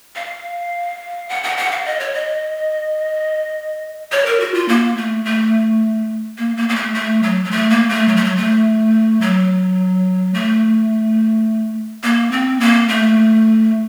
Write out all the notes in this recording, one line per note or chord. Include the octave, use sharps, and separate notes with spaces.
F5
F#5
F#5
F#5
F5
D#5
C#5
D#5
C#5
A#4
F#4
F4
A#3
A3
A3
A#3
A#3
A#3
A3
A3
F#3
F#3
A3
A#3
A3
F#3
A3
F#3
A3
F#3
A3
A#3
C4
A#3
A3